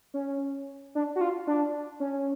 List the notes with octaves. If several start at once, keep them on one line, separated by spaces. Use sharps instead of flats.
C#4
D4
F#4
F4
D4
C#4